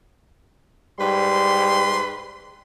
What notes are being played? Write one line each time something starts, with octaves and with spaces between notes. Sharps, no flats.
G#2 G3 B4 C6